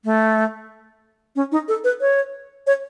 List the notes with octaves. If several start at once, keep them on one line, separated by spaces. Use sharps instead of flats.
A3
C#4
D#4
A4
B4
C#5
C#5